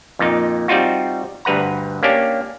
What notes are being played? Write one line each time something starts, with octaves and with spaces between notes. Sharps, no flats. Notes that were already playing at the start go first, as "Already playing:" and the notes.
F2 A#2 D#4
G3 C4 D#4 F4 F#4
D2 G2 B4 F#5 A#5
A#3 C#4 D4 G4